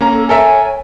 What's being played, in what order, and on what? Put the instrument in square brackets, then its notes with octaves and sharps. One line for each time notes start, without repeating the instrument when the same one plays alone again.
[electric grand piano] A#3 C#4 A#5 [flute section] A4
[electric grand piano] A4 A#4 E5 [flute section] C#5 G#5